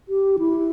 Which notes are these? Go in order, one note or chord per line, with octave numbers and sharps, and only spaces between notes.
G4
E4